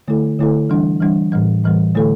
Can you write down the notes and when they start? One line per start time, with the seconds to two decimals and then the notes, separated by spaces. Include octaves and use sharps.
0.08 D3 A3 E4 A4
0.39 D3 A3 E4 A4
0.70 E3 G3 D4
1.01 E3 G3 D4
1.32 A2 E3 G3
1.64 A2 E3 G3
1.95 D3 A3 E4 A4